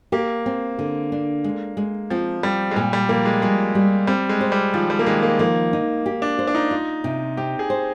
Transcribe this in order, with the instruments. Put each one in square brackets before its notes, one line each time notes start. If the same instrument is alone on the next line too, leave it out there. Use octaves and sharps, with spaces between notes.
[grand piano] A#3 [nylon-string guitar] G4
[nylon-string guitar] C4
D3
D4
G#3
G#3
[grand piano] F3 [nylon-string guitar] C4
[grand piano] G3 [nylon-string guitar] C4
[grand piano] G#3
[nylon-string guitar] A#2 [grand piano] G3
[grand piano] G3
[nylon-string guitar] F3 [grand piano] A#3
[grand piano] G#3
[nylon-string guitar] G3 [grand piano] G#3
[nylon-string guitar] G3
[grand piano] G3 [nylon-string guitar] C4
[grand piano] G#3
[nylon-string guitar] C5
[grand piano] G3
[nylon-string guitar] D#3 [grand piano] F3
[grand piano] G3
A#3
[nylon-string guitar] D#3 [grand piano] G#3
[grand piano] A#3
[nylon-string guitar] F3 [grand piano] A#3
[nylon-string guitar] D#4
G4
[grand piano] D4
[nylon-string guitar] C5
[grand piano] D4
D#4
[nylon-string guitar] F4
C3
[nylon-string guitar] C4 [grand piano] G4
[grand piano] G#4
[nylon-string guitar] C5